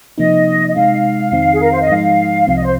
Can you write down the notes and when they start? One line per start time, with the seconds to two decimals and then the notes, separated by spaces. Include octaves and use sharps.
0.18 C3 F3 A#3 D#4 D#5
0.67 D#5
0.75 C3 G#3 D#4 F5
1.32 F2 D#3 C4 D#4
1.51 G#4
1.60 A#4
1.70 C5
1.80 D#5
1.89 G#2 F3 G#3 D#4 F5
2.47 C2 C3 F3 C4 F5
2.55 D#5
2.63 C5